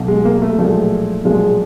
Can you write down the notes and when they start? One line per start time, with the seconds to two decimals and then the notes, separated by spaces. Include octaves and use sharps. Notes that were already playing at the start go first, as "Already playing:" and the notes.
Already playing: B1 B2
0.08 G#3
0.25 A#3
0.42 A3
0.58 B1 A#2 F3 G#3 A3
1.25 B1 A#2 F3 G#3